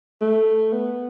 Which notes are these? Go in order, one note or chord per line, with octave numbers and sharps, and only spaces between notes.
A3
B3